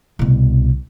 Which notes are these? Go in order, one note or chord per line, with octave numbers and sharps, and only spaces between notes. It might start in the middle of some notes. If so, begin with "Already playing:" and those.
C2 B2